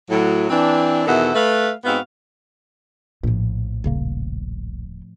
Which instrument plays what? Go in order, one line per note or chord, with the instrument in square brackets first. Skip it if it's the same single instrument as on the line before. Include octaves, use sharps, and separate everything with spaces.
[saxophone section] A2 F#3
E3 C4 D4
E2 B2 D#3 A4 E5 F#5
A3 B4 F5
G#2 B3 C4 F#4 F5
[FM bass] A#1 [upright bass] A2 F3
[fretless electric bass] D#1 C#3 A#3